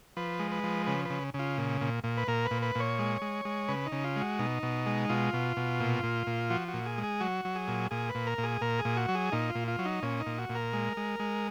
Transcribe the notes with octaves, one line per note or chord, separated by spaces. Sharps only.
F3 B4
G#3
B4
F3
C#3 B4
C#3 B4
C#3
F4
A#2
A#2
A#2
B4
A#2 A#4
B4
A#2
B4
A#2 C#5
G#3
G#3
G#3
C#3 B4
D#4
C#3
F4
G#3 F#4
B2 D#4
B2
G#3
B2 F4
B2
B2
A#2
A#2
A#2
F3 F#4
F#4
A#2
G#4
G#3
G#4
F#3 F#4
F#3
G#4
A#2
A#2 G#4
B4
A#2
A#4
A#2
G#4
A#2 A#4
G#4
A#2
F#4
F#3
G#4
A#2 D#4
F4
A#2
F4
F#3
D#4
A#2 C#4
D#4
A#2
F#4
A#2
A#4
G#3
G#3
G#3